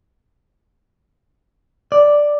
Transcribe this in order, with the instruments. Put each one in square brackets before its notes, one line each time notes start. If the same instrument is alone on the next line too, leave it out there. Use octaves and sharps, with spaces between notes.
[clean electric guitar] D5